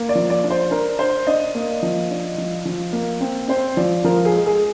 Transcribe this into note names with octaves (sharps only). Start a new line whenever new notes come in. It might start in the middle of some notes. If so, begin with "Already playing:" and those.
Already playing: A#3
D5
F3
D5
D4
C5
D4 A#4
D4 C5
D4 D#5
A#3
F3
D4
F3
F3
A#3
C4
C4 C5
F3 D5
F3 A#4
G#4
G#3
G#4